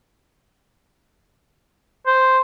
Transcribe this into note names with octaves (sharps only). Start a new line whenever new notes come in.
C5